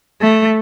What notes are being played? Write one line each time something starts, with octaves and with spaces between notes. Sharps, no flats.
A3